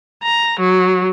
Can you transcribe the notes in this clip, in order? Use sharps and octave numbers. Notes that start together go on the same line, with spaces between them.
A#5
F#3